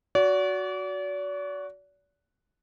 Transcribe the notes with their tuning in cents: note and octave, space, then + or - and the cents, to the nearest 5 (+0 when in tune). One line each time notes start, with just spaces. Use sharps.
F#4 +0 D5 -40